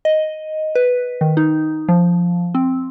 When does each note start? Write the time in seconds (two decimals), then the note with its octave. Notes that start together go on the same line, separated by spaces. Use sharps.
0.05 D#5
0.75 B4
1.21 D#3
1.37 D#4
1.88 F3
2.55 C4